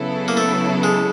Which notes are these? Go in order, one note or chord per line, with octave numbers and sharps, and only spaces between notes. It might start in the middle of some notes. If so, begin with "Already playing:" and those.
Already playing: C#3 F#3 B3 E4 A4
A#3
A3
G#3